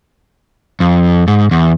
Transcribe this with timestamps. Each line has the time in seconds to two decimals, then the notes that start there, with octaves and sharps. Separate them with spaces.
0.80 F2
1.28 G#2
1.51 E2